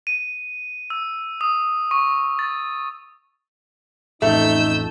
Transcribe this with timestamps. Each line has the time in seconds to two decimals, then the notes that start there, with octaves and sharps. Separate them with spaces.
0.07 D#7
0.90 E6
1.41 D#6
1.91 C#6
2.39 A6
4.22 A1 F2 A3 D#4 E6 G6